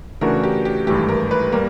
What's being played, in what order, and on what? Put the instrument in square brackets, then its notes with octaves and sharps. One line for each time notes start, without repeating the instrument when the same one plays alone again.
[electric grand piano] C#3 E3 A3 D4 F#4 [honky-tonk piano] A#4
[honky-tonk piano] G4
G4
[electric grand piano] G#1 G2 E3 A3 [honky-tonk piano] G4
[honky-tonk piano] A#4
B4
[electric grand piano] G3 A#3 [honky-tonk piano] A#4